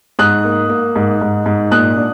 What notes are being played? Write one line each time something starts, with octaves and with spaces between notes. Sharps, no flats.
G#2 D#6 F#6
A#3
A#3
G#2
G#2
G#2
A#2 D#6 F#6
D4